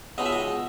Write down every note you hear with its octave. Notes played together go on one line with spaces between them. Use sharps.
C#2 B2 G#3 D#4 D#5
E5
D#5